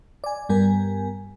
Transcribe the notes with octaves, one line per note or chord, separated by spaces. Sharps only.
D5 G#5
G2 G3 B3 A#4 G#5